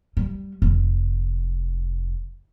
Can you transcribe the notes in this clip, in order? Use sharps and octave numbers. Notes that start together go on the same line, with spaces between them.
G3
F1